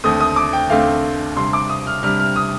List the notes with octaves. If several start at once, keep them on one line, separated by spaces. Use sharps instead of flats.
D#2 D3 A3 C4 D#6
D#6
D6
G5
D#2 D3 A3 C4 F5
C3 G3 D4 C6
D6
D#6
F6
C3 G3 D4 F6
F6
D#6